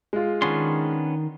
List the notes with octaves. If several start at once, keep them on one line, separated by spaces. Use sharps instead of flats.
G#3 F4
D#3 B3 C#4 D4 C6